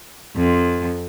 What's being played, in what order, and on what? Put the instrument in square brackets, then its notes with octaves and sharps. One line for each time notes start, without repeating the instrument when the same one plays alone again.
[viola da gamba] F2